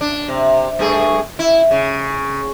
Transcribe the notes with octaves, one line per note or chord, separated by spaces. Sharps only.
D4
C3
G2 A3 G#4
E4
C#3